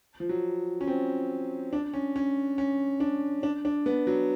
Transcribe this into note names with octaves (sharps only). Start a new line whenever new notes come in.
F3
F#3
C#4
C4
D4
C#4
C#4
C#4
D4
D4
D4
B3
F#3